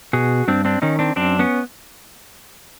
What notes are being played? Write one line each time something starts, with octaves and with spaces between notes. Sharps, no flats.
B2 F#4 G#4
G2 C4 D4
C4 D4
D#3 C#4 D#4
C4 D4
F#2 C4 D4
B3 C#4